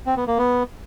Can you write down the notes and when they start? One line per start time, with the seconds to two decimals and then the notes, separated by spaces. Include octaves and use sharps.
0.06 C4
0.17 B3
0.27 A#3
0.38 B3